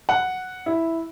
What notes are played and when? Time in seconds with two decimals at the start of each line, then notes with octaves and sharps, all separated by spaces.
0.09 F#5
0.66 E4